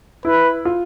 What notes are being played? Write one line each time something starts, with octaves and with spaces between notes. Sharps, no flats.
E4 B4
F4